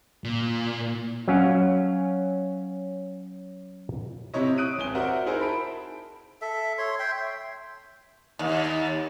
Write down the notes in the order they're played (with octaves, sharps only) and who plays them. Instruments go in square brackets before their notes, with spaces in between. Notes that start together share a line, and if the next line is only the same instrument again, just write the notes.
[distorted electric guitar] A#2
[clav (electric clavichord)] F#3 C#4 F5
[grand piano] C3 C4 E4 C#5 D#5
D#6 F#6 D7 D#7
G#1 C4 G#5 G7
F#4 A#4 C5 D5 E5 F#5
D#4 E4 G#4 A#4 C5 D#5
A5 B5 D7
[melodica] A4 E5
C#5 C6
E5 G5 C6
[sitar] D#2